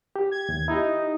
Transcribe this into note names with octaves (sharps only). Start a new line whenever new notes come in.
G4
G#6
D#2
D#4 E4 G4